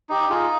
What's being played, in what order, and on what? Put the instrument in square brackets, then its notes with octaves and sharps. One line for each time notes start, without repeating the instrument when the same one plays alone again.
[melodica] D#4 [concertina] G4
[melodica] D#4 [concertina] F4 G#4